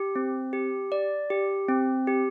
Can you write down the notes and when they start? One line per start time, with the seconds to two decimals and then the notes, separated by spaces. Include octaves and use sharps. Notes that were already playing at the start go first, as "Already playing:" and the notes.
Already playing: G4
0.16 C4
0.53 G4
0.92 D5
1.30 G4
1.69 C4
2.07 G4